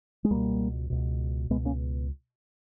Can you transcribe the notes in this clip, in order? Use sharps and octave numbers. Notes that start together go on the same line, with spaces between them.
G#3
C#2 B2 G3 A#3
C#2 B2
C#2 B2 G#3 B3
A#3 C#4